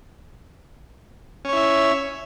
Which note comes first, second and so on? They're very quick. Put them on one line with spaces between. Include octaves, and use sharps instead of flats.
C#4 C#5 E4 E5